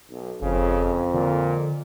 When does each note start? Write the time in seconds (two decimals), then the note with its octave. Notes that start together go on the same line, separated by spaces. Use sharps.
0.10 B1
0.42 F#1 F2 C#3
1.14 A#2 D3